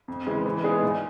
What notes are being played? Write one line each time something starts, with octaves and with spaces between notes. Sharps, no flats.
F2
C#3 E3 G#3
E3
G#3 B3 D#4 G#4
A#2